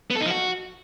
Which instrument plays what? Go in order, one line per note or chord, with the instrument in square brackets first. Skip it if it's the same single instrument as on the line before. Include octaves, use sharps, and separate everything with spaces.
[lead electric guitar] B3
A4
D#4
F3
F#4